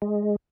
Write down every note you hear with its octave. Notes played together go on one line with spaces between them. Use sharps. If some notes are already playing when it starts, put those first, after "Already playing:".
G#3